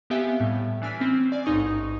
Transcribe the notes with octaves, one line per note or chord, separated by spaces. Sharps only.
B3 C4 G4 E5 F5 G#5
A2 G3
E3 D4 G#5 F6 B6
C4 C#4
D5 G#5
A1 G#2 D#4 C#6 D#6